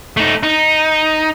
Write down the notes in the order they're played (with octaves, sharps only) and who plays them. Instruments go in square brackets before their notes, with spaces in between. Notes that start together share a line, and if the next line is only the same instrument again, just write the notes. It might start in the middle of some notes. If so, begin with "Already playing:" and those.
[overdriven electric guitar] A3 D#4
D#4